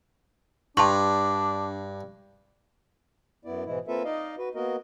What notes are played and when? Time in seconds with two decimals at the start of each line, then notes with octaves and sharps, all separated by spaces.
0.77 G2 D4 A5 C6 C#6
3.45 F#2 B3 E4 D5
3.65 G#2 B2 E3 G#3 E4
3.88 A#3 C4 F4 A4 B4 E5
4.05 D#4 D5 D#5 F5
4.38 F#4 B4
4.55 A#3 B3 F#4 A#4 D#5